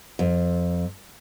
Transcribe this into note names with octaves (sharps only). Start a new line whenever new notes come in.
F2